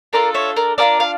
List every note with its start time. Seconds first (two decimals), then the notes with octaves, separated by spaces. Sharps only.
0.13 D4 F4 A4 A#4 D5
0.34 C#5 E5
0.56 A#4 D5
0.78 D4 F4 A4 A#4 D5
1.00 F5